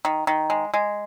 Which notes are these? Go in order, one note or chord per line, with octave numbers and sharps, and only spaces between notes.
D#3
D#3
G#3
G#3